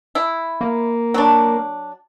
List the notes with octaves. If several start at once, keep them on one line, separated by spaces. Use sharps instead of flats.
E4
A#3
F#3 D4